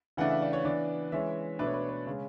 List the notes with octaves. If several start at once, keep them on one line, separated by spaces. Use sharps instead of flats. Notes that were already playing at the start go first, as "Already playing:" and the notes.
C#3 E3 A3 D4 F#5
E5
D5
C#5
E3 B3 D4 D5
E3 G#3 C#4 E5
B2 A3 D4 B4
C#5
B4
C#5
B4
C#3 G#3 C#4